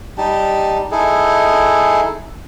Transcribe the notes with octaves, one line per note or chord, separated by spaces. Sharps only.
G3 D#4 G4 A5
D#4 E4 G#4 A4